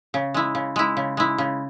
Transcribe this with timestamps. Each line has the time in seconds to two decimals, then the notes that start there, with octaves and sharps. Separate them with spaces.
0.14 C#3
0.34 G#3 E4
0.55 C#3
0.76 G#3 E4
0.97 C#3
1.17 G#3 E4
1.38 C#3